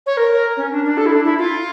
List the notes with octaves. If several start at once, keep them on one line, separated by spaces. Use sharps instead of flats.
C#5
A#4
C#4
D4
D4
A4
E4
D4
E4
F4